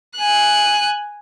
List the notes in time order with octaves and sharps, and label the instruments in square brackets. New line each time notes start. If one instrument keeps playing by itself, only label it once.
[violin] G#5 F#6